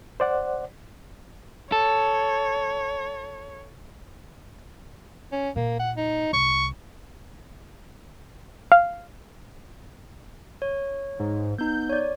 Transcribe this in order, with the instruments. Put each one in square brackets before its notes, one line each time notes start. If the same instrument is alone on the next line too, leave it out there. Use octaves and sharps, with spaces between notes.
[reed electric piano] C5 D5 F#5
[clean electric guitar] A4 [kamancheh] C#5
[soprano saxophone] C#4
[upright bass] A#2 [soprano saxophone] A#3
[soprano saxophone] F#5
D#4
[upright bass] C2 [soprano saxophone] C#6
[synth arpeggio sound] F5
[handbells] C#5
[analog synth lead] G#2
[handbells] B3 D#4 [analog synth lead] G6
[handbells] C#5 D5